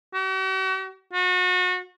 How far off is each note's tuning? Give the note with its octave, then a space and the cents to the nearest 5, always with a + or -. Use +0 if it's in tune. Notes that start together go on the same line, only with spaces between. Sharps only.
F#4 +45
F#4 -30